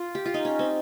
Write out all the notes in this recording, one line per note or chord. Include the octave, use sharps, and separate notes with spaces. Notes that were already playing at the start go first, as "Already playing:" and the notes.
Already playing: F4
G4
F4
D#4
C#4
C4